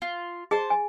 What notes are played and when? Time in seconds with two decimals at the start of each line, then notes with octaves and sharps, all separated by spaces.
0.02 F4
0.51 G#4 C5 A5
0.70 G#5